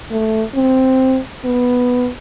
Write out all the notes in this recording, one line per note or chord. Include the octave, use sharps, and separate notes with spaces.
A3
C4
B3